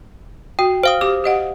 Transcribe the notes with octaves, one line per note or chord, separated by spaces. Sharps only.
F#4 G5
C5 F5 D#6
G4 D6
G4 D#5 F#5